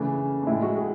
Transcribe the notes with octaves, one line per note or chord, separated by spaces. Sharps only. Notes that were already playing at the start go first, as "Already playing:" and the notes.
Already playing: C#3 E3 A3 D4
D4
A2 G#3 E4
F#4
G#4